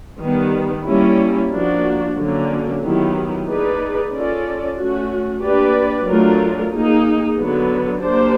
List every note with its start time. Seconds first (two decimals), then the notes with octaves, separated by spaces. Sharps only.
0.22 D#3 G3 B3
0.86 G3 A#3 C#4 E4
1.52 F3 A#3 D4 F#4
2.18 D3 F#3 A#3 C#4
2.82 D#3 F#3 B3 E4 G4
3.47 A#3 D#4 G#4 B4 D5
4.13 C#4 F4 A4 D5
4.78 A3 C#4 F#4
5.42 A#3 D4 G4 B4 D5
6.07 F#3 A3 D4 F4 A#4
6.72 A#3 D#4 G#4
7.38 D3 F#3 B3
8.02 A#3 D4 G4 C5